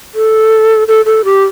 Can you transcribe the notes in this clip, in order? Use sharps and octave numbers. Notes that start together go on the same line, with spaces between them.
A4
A4
A4
G4